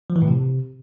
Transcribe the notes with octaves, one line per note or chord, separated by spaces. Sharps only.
F3
E3
A2
C3